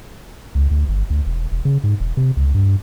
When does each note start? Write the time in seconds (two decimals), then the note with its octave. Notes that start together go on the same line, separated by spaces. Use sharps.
0.55 C#2
0.71 D2
0.89 G1
1.10 D2
1.26 E1
1.52 E1
1.65 C#3
1.84 G#2
2.00 E1
2.17 C3
2.37 C#2
2.54 G2